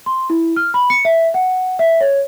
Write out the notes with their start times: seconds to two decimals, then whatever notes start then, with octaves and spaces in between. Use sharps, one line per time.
0.06 C6
0.30 E4
0.56 F6
0.74 B5
0.90 C#7
1.05 E5
1.34 F#5
1.79 E5
2.01 C#5